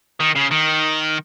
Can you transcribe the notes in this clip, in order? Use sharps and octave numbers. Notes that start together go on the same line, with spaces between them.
D#3
C#3
D#3